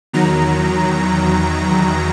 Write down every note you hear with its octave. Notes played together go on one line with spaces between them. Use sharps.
E2 D#3 F#3 A#5